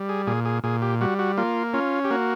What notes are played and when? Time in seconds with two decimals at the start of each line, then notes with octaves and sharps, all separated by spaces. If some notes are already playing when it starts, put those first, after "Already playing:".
Already playing: G3
0.09 G#4
0.27 A#2 G#4
0.45 G#4
0.64 A#2 G#4
0.82 G4
1.01 G3 F#4
1.19 F#4
1.38 A#3 F4
1.74 C#4 F4
2.05 G4
2.11 A#3 F#4